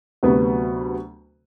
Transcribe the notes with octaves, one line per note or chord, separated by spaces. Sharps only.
D2 C3 F#3 B3 F#4